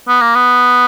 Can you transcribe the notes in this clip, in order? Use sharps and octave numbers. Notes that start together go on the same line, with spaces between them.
B3
A#3
B3